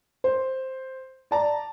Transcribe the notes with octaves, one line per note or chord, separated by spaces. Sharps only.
C5
D5 A5 A#5